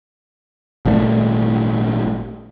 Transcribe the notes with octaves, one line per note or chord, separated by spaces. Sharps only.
G#1 A#2 G3 A3